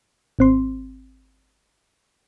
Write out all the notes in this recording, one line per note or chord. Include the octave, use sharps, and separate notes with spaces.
G#1 C4 C6